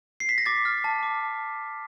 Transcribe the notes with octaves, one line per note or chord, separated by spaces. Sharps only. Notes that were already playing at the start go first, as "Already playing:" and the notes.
C7
B6
A#6
D6 A6
F6
A5
D6